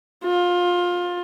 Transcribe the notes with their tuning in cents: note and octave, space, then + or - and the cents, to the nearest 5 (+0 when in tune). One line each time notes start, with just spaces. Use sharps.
F4 +20